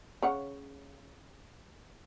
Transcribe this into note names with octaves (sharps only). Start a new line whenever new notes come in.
C#3 C#5 F#5